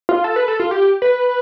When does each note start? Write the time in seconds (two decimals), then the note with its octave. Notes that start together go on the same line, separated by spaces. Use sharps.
0.09 F4
0.24 A4
0.36 B4
0.48 A4
0.60 F4
0.71 G4
1.02 B4